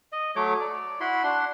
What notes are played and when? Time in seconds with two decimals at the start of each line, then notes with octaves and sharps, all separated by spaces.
0.12 D#5
0.36 F#3 A3 C#5 D6
0.61 D5
1.00 E4 F#4 B5 C6
1.24 D4 F#5 C6